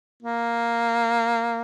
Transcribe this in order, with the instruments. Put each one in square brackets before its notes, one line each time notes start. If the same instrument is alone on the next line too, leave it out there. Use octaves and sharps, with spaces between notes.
[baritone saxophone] A#3